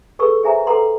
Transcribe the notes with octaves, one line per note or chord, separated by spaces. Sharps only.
G#4 A4 B4 C#6 E6
G#4 C5 E5 G#5 A#5
A4 B4 F#5 A#5 C6